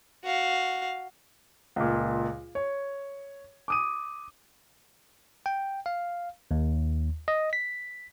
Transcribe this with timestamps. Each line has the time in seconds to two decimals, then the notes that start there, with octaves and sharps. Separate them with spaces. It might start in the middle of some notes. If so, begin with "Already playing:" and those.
0.24 F#4 F5
1.76 C#2 A#2
2.55 C#5
3.68 D6 D#6 D#7
5.46 G5
5.86 F5
6.51 D#2
7.28 D#5
7.53 B6